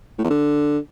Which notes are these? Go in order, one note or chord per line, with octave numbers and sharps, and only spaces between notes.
A2
E2
D3